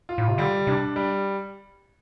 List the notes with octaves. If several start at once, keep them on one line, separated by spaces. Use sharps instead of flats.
F4
A2
C3
D3 G3
C3 D4
G3